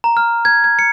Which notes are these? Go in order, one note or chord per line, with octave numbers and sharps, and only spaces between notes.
A#5
F6
G#6
G#6
C#7